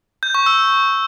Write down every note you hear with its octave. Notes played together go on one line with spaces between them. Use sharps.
G6
C#6
E6